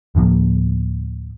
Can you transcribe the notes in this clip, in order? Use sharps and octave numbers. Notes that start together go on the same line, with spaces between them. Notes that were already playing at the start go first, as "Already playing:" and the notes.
D2 A2 F3 A#3